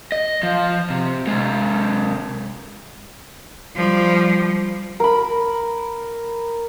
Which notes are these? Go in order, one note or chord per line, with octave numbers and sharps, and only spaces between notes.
D#5
F3
C3
C3 G#3
F3 G3
A#4 B5